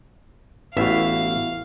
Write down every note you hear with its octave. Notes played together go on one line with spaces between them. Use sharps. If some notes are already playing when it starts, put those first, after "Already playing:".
A1 B3 E4 F#4 E5 F5